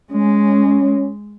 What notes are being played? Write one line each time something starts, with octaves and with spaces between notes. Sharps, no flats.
G#3 C#4